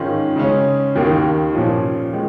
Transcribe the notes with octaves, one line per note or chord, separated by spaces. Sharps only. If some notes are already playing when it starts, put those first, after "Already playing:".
Already playing: G#2 D#3 C#4 F4
C#3 G#3 C#4
D#2 D#3 A#3 D#4
A#2 F3 C#4 F4
D#3 G#3